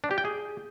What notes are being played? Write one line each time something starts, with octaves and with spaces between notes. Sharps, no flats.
D4
G4
G5
G#4